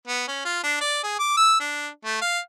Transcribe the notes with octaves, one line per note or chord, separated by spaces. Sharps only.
B3
C#4
F4
D4
D5
G#4
D6
E6
D4
A3
F5